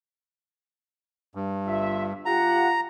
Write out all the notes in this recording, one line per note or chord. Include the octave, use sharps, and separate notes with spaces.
G2
G1 F4 E5
F4 G4 F#5 A#5